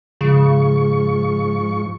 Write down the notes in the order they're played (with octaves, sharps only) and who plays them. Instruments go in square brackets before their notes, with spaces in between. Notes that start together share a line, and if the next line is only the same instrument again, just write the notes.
[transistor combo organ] G#2 F3 C#6 [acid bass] C#3